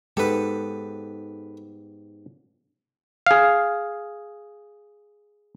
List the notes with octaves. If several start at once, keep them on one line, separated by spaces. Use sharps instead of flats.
G#2 G#3 B3 G4 A4 B4
G#4 F5